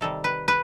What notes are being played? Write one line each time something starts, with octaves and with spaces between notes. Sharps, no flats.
C3 D#3 G3 A4
B4
B4